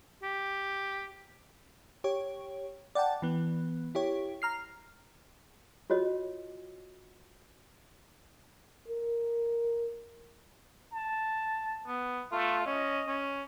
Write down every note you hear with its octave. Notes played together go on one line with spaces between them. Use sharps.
G4
G4 C#5
D5 F#5 G5 A5
E3 B3
E4 G4 C#5
A#5 F6 C7
F4 F#4 C#5 D#5
A#4
A5
B3
A3 F4
C#4 D#5
C#4